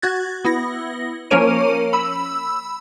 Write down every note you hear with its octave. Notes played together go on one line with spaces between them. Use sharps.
F#4 F#6 G#6 A6
B3 E4 A#6
F3 A#3 C#4 A#4 C#5 D#7
B5 E6